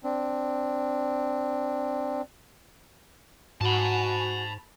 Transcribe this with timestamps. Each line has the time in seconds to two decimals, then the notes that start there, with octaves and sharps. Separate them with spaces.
0.04 C4 D4
3.61 G#2 F#4 G#5 A5 B5